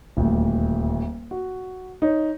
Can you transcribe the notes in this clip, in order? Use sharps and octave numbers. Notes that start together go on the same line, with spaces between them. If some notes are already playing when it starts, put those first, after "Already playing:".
D#1 D2
F#4
D#4 C#5